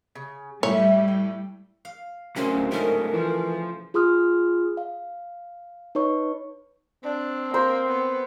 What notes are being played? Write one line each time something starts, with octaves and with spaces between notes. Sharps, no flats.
C#3
A2 G3 A3 E4 C#5 E5
G5
F5
A2 C#3 F#3 A#3 C4 C#4
D1
G#2 A3 C#4 A#4 D#5
E3 F3
F4 G#4 C6 D#6 F6
F5
D#4 B4 C#5 C#6
C4 D4
A#3 C5
B3